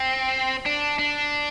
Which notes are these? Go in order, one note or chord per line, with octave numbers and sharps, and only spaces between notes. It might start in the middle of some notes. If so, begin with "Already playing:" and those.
Already playing: C4
D4
D4